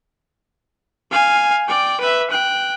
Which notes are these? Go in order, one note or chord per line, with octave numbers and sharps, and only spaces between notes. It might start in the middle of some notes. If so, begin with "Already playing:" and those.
F5 G#5
D5 G5
B4 E5
G5 F#6